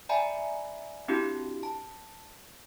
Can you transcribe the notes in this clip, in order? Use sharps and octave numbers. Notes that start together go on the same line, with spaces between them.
D5 E5 G5 G#5 A#5 B5
C4 D4 E4 F#4 G4
A5